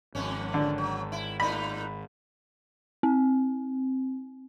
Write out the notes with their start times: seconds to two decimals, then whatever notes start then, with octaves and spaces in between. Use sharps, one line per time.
0.15 G#1 F2 B3 C#4
0.54 D3
0.78 F#3
1.12 E4
1.40 A2 D#4 B5
3.03 C4